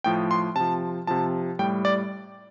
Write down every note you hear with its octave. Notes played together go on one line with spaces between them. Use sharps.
A2 F3 G5
C6
C3 F3 A5
C3 F3 A5
A2 G3 G5
D5